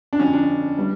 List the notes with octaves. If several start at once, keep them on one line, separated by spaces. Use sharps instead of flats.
D4
F2 D3 F3 C#4
D4
E3 G3